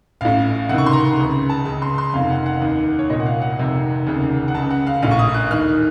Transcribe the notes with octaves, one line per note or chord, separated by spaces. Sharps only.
A1 A2 F5
C#2 C3 D#3 F#5
C#6
C6
A#5
C#2 C#3
A5
C#2 C#3 A5
C6
C6
F1 F2 D#3 F5
F#5
F#5
D#2 D#3
C#5
C2 A#2 D#5
F#5
F5
F#5
F1 F2 C3 D#3
F1 D#2 C#3
F#5
C#2 C#3 A5
F#5
F5
A#1 A2 F5
C#6
D#6
F#6
D#2 D#3 F6